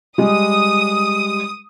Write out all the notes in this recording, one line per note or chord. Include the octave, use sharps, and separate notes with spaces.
G3 G#3 D#6